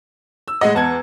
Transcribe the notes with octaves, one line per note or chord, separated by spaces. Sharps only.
E6
A2 G#3 D#5 F#5
E2 F#5 A5 G#6